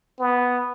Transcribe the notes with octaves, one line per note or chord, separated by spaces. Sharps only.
B3